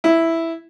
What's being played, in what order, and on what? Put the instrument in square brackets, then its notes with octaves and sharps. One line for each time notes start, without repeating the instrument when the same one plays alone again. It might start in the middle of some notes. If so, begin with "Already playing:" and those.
[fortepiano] E4